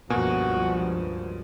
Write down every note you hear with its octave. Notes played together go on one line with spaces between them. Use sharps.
C#2 G2 B2 F3 A#3 F#4 G#5